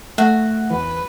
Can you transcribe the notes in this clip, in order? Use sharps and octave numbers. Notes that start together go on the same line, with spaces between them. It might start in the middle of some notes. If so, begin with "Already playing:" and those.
A3 F#4 E5
E2 E3 B4